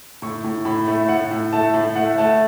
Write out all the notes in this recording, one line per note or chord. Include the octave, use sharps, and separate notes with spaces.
A2 C#6
A2
A2 B5
A3
A2 F#5
A2
A3 A5
A2
A3 F#5
A3 A5